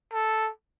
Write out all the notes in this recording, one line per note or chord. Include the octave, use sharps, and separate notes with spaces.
A4